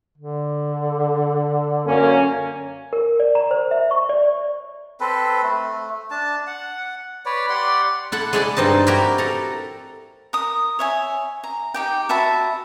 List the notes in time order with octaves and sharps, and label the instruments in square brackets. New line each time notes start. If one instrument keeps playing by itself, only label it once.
[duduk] D3
[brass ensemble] F#2 A#3 C#4
[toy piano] A#4
D5
A#5
C5
E5
C#6
D5
[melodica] C4 A4 B4
A3
D4 A5
F#5
B4 C#5 D5
G4 D5 F#5 C6
[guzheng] E4 A4 F#5
G#3 E4 D5 F#5
G2 C4 D#4 A5
E4 F#4 G4 A#4
A4 A#5
[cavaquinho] A#4 D#6
C#5 E5 G#5
A#5
D#4 G4 G5
F#4 E5 A5 B5